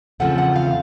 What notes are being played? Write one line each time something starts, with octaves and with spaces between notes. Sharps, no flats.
E2 C#3 F3 A3 C4 F#5
F#5
F5